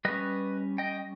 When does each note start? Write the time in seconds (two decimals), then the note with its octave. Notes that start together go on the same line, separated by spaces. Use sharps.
0.05 G3 C#4 B4 D#5
0.78 D#5 G5